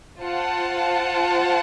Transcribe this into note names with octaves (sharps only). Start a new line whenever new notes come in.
F4 C5 F#5 A5